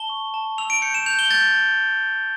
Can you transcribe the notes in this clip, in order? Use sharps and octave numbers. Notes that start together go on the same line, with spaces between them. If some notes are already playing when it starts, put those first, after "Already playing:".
Already playing: A5 G7
C#6
A5
E6 F7
D7
G6 C#7
E7
G6 F7
G7
G6 A6